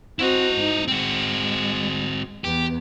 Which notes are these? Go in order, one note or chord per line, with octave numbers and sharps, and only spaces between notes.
C4 E4 F#4 D#5
G#2 D#4
G#3 C4 F#4
E2 B3 G4